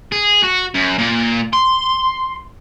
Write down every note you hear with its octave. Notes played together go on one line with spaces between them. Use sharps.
G#4
F#4
F#2
A#2
C6